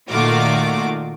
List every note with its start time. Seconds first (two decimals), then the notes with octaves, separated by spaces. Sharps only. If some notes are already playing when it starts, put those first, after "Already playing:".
0.10 A#2 D#3 A3 F4 F#4 D6